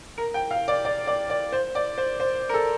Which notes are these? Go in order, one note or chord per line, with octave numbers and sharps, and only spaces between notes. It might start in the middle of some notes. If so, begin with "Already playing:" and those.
A#4
G5
F5
D5
D5
D5
D5
C5
D5
C5
C5
A#4
A4